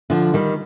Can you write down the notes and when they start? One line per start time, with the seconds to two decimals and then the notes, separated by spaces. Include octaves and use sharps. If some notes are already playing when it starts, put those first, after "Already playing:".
0.10 D3 F3
0.34 D#3 G3